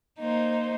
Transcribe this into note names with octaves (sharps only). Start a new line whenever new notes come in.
A#3 D#4 C5